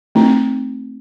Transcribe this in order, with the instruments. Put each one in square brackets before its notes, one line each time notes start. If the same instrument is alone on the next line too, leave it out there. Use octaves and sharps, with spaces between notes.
[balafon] A3 C4 D#4